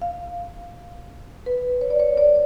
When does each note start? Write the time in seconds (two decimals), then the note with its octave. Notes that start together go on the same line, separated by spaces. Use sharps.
0.02 F5
1.46 B4
1.81 C#5
1.90 D5
2.00 C#5
2.17 D5